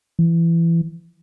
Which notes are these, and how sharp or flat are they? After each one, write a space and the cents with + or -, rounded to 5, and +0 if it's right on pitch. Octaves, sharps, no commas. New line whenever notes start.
E3 +20